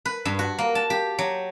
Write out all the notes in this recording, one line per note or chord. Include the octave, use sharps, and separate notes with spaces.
B4
G2
F#4
A#3
A5
G4
F#3